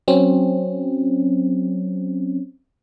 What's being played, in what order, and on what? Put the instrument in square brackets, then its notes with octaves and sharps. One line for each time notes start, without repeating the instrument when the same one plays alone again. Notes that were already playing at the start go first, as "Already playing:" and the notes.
[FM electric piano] F#3 C4 C#4